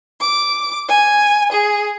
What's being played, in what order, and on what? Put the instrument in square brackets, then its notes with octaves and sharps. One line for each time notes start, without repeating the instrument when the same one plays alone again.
[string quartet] D6
G#5
G#4